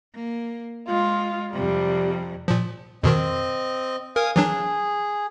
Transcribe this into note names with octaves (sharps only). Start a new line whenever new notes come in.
A#3
G#3 F4
F2 C3 G3
A#2 F3
F2 B2 D#3 C4 D#5
A#4 F5 G#5 D#6
E3 F#3 D4 G#4